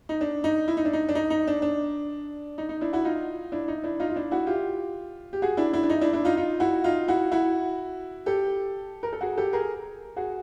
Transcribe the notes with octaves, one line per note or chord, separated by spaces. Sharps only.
D#4
D4
D#4
E4
D#4
D4
D#4
D4
D#4
D#4
D4
D4
D#4
D#4
D4 E4
E4 F#4
D#4 F4
D4 E4
D#4
D4 E4
D#4 F4
F4
D4 E4
E4 F#4
F4 G4
G4
F#4 G#4
D4 E4
D4 E4
D4
D#4
D4 E4
D4 E4
D#4 F4
D#4 F4
E4 F#4
D#4 F4
E4 F#4
E4 F#4
G4 A4
A#4
A4
F#4 G#4
G4 A4
G#4 A#4
F#4 G#4